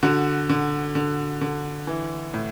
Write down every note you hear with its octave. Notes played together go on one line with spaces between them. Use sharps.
D3 F#4
D3
D3
D3
E3
A2